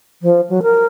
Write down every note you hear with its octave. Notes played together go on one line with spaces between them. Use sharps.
F3
F#3
A#4